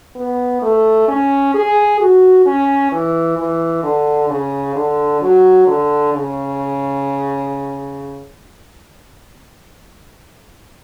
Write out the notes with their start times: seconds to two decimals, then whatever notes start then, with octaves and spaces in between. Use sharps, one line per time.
0.16 B3
0.62 A3
1.08 C#4
1.54 G#4
2.00 F#4
2.46 C#4
2.92 E3
3.38 E3
3.83 D3
4.30 C#3
4.75 D3
5.21 F#3
5.67 D3
6.13 C#3